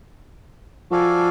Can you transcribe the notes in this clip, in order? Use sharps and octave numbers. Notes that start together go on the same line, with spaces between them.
F3 F#4 A4 D5 F5 G#5